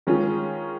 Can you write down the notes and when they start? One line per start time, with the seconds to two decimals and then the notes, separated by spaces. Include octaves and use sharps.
0.07 D#3 G#3 C#4 F4 G#4